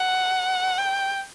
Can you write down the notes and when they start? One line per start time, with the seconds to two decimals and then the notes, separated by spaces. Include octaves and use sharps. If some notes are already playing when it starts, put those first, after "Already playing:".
Already playing: F#5
0.78 G5